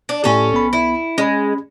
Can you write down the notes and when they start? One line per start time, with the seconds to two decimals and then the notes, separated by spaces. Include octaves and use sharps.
0.09 D4
0.24 A2 C#4 G4 A4
0.52 B1 B3 B5
0.73 E4
1.18 G#3 C#4 B5